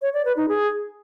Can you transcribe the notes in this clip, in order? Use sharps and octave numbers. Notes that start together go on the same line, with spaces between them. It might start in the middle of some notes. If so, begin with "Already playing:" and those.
C#5
D5
B4
D#4
G#4